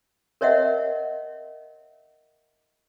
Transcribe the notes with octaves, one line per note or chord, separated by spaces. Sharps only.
A#4 C#5 D#5 E5 F#5